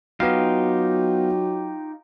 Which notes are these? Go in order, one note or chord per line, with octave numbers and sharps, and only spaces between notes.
F#3 B3 D#4 F4 G4 F5